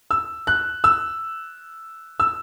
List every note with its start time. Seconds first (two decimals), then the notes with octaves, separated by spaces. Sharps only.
0.11 E6
0.47 F#6
0.84 E6
2.20 E6